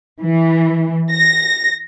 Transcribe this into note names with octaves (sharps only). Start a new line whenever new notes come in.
E3
A#6